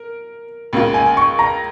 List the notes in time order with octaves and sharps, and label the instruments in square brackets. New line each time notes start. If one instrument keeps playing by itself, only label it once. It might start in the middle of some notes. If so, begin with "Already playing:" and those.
Already playing: [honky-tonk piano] A#4
C#2 C#3 A#3 F4
[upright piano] G#5
C#6
A#5